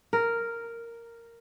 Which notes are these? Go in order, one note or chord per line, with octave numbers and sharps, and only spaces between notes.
A#4